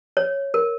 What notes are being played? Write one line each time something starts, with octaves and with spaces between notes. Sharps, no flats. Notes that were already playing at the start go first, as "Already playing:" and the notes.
C#5
A#4